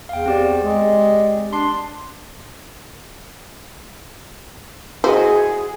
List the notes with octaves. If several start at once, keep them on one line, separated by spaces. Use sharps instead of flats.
E2 F5 G5
C4 G4 D5
G#3
D4 C6 C7
E4 F#4 G#4 C5 D#5